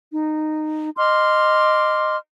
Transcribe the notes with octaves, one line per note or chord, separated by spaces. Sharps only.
D#4
D#5 C6 D6 F6